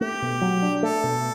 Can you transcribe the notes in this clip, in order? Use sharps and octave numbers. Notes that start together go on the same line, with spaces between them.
A3 G4
B2
F#3
D4
A3 A4
B2